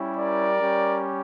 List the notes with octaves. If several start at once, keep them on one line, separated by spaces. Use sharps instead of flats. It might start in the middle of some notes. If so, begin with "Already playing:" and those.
Already playing: G3 C#4 E4 G4
A#4 D5
G3 C#4 G4